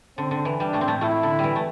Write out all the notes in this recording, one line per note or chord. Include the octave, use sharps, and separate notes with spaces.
D3 C4
D3
E3
G3 D4
A2 A3
C4
A2 A3
A2 A3 E4
D3
E3 G3
A3